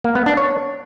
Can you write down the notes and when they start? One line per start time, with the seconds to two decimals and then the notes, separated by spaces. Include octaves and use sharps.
0.04 A#3
0.15 B3
0.26 D4
0.37 C#5